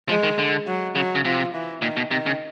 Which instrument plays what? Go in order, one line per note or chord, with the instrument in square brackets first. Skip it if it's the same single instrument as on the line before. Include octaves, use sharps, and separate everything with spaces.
[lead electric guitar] F3 [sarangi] G#3
[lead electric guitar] D#3
D3
[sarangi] F#3
[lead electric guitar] C#3 [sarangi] F#3
[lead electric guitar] C#3
[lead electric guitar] C3 [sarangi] F3
[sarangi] E3
[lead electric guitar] A#2 [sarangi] D#3
[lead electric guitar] B2
[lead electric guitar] C3 [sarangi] D#3
[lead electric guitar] C#3